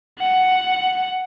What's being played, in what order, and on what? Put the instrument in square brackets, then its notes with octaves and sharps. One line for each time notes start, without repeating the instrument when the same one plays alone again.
[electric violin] F#5